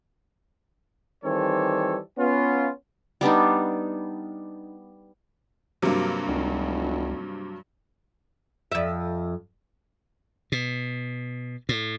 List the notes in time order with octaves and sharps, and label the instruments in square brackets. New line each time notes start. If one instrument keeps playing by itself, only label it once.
[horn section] D#3 E3 G3 C4 A4 C#5
B3 C#4 F4
[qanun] G3 B3 D4 D#4
[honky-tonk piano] G2 F#3 [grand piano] C3 A#3
[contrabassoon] F1 [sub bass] C#2
[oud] F2 E5
[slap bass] B2
A2